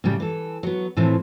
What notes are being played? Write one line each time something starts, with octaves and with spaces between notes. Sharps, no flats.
A2 C#3 G3
E3 A4
F#3 B3
A2 E3 F3 C4 E4